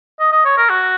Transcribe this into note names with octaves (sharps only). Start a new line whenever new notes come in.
D#5
D#5
C#5
A#4
F#4